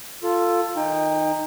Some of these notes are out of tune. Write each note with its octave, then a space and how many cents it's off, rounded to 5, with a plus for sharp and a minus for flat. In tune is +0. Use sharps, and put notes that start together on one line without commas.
F4 +0 A4 +15
D#3 +0 D#4 -5 G5 +30